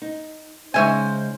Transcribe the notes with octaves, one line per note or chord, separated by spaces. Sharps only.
D#4
C#3 G#3 D#4 C5 C#5 E5 G#5